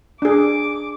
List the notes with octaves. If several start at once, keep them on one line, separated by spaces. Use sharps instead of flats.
D4 G#4 D6